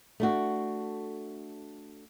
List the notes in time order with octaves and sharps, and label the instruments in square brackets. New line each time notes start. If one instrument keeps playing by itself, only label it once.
[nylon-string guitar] A3 D4 F#4